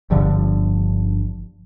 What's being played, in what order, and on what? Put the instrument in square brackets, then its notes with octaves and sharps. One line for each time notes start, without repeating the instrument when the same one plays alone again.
[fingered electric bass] G1 G2 D3 F3